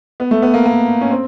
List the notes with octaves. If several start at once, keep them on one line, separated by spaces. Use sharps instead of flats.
B3
A3
B3
A#3
A#3
C#4
C4